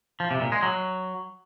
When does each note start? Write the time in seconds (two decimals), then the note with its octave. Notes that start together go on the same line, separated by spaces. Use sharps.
0.20 F3
0.31 C3
0.41 A#2
0.52 G#3
0.63 F#3